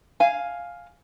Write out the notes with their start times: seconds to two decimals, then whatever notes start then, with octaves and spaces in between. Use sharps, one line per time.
0.20 F5 G#5